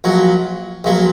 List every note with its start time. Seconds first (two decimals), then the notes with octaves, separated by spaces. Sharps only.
0.04 A#1 A#2 F#3
0.84 A#1 A#2 F#3